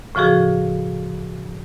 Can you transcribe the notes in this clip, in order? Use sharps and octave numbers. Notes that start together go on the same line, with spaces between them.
A2 C#3 F3 F#4 G#4